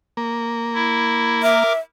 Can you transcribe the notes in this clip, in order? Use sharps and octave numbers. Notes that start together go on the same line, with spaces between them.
A#3
E4
A#4 E5 D6